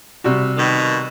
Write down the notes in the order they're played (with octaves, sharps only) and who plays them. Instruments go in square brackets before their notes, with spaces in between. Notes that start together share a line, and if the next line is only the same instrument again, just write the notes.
[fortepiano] C3 G3 F#4
[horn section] B2 D#3